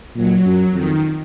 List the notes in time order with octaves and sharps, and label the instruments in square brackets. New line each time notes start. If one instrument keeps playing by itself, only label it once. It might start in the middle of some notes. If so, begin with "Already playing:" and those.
[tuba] A#2 [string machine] F#3
[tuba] F#2
[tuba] F2 [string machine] D#3